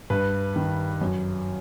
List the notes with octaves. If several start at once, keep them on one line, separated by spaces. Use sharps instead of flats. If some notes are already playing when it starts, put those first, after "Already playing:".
G2 B4
D#3
F#2